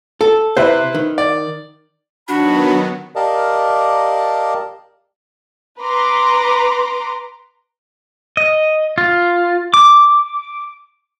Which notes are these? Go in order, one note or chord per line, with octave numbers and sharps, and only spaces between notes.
A4
C3 E4 B4 C5
D#3
D5
D#3 F#3 B3 D4 F#4 B5
G4 A#4 D5 D#5 F5 A5
B4 A#5 C6 D6
D#5
F4
D6